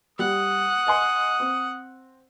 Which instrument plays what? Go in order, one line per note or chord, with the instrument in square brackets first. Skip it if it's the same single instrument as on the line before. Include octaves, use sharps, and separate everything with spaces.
[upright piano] G3 [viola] F#5 [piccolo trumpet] D#6
[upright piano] D#5 G#5 C6
C4